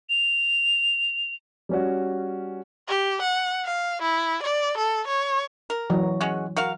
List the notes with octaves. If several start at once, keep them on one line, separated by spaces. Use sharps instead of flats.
F7
G3 C#4 F#4
G4
F#5
F5
E4
D5
A4
C#5
A#4
E3 F#3
G#3 C#4 F#4
F#4 A#4 F5